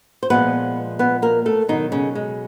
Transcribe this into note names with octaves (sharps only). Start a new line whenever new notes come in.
C5
A#2 F3 G#3 B3 B4
B3 B4
A#3 A#4
A3 A4
B2 D#3 F#3 D#4
C#3 C#4
G#3